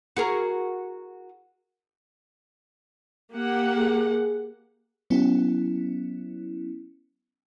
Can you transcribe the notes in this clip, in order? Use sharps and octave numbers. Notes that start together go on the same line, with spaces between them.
F#4 G#4 A#4
A#3 G4 F#5
G#4
F#3 B3 C#4 E4